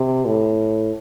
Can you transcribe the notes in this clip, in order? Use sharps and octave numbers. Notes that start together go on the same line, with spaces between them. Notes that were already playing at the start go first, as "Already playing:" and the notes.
Already playing: C3
A2